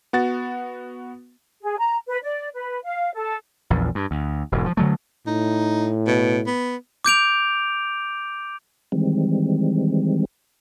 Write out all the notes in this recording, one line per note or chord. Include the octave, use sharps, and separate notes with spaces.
B3 F#4 A6
G#4
A#5
B4
D5
B4
F5
A4
A#1 E2
G2
D2
E1 G#2
F3
D3 F#3 A3
A2 D#4
B2
B3
D6 G6 D7 F7
D#3 E3 G3 G#3 C4